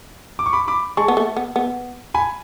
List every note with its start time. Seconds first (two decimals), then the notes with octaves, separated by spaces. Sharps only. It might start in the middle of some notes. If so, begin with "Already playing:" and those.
0.39 D6
0.46 C#6
0.53 B5 D6
0.68 B5 D6
0.97 G#3 A5 C#6
1.08 B3
1.17 A3
1.37 B3
1.56 B3
2.14 G#5 B5